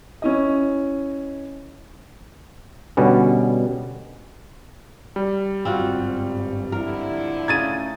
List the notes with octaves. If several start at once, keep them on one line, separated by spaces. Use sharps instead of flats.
C#4 E4 D#5
B2 D3 G3 B3 C#4
G3
G1 G#2 C4 F4 F#4
D3 F3 E4 A#4
C#3 A3 D#4 G#6 A6 D#7